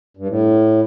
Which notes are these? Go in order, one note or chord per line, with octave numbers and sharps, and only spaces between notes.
G2
A2